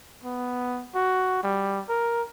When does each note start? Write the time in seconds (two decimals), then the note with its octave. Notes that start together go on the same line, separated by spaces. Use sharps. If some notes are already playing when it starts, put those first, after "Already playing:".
0.24 B3
0.95 F#4
1.43 G3
1.89 A#4